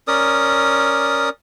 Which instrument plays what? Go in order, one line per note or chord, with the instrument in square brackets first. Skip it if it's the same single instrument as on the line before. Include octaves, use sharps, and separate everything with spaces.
[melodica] C#4 A#4 D5 D#6